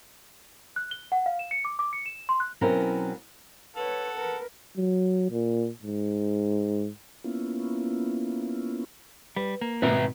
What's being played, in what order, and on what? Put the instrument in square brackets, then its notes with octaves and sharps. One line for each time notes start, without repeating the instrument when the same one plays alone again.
[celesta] F#6
G7
F#5
F5
E7
C#7
D6
D6
C#7
E7
C6
F#6
[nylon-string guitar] B2 F#3 C4 C#4 E4 A#4
[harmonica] A4 F#5 [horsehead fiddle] B4 C#5
[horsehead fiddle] A#4 B4
[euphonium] F#3
A#2
G#2
[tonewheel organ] A#3 B3 C#4 E4 F4
[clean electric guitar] G3 [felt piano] B4
[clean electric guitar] A#3
[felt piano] G#1 B2 [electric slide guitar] B4 E5 A#5